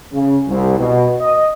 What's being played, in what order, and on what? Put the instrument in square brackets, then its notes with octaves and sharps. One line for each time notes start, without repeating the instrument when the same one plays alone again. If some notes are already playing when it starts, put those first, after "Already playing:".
[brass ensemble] C#3
C2
B2
D#5